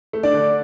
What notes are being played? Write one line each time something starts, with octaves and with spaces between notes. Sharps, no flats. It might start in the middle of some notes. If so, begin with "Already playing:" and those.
A3
D4 D5
D3